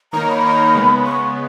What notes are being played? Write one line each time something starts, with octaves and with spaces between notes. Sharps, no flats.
D#3 A#3 D#4 A#4 C#5 A#5
B5
D#3 A#3 D#4 A#4 C#5
C#3 G#3 B3
C#3 G#3 B3 C#6